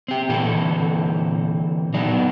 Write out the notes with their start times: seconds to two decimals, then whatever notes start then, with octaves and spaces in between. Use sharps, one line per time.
0.08 C4 G4
0.29 A#2 D3 E3 C4 A4
1.94 F#3 B3 D4 D#4